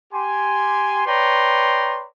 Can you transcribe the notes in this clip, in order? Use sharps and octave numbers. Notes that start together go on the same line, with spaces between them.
G4 G#5 C6
B4 C#5 D5 G5 A#5 C6